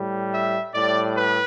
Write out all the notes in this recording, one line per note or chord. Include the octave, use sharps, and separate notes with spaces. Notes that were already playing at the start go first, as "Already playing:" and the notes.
Already playing: A2 G3
E5
A2 G3 D5
B4